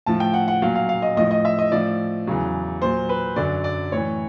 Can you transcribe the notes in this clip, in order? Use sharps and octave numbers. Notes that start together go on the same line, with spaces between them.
A2 F3 A5
G5
F#5
F#5
A#2 F#3 F5
F5
F5
D#5
A2 F3 D#5
D#5
E5
D#5
A2 F3 D5
E2 C#3 F#3
A#2 F#3 C5
B4
F#2 D3 F#3 D5
D5
A2 E3 C#5